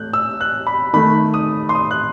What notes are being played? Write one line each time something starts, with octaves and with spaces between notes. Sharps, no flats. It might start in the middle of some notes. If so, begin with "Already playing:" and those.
Already playing: A3 F#6 G6
E6
F#6
B5
D#3 A3 B5
D#6
C6
D#6
F#6